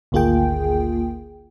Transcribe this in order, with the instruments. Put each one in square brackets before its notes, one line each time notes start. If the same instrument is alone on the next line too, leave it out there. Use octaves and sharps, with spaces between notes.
[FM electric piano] G#1 D2 A#3 F4 G#4 G5